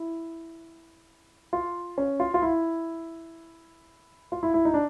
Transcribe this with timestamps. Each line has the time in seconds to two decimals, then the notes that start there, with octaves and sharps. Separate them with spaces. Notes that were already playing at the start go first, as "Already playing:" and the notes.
Already playing: E4
1.53 F4
1.98 C#4
2.20 F4
2.34 F4
2.42 E4
4.32 F4
4.43 E4
4.54 E4
4.65 D#4
4.74 D4